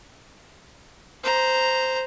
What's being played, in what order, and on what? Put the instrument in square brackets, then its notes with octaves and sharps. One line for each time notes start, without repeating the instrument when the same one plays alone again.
[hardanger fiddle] C5 A#5